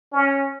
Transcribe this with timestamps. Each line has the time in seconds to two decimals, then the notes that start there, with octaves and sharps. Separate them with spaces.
0.13 C#4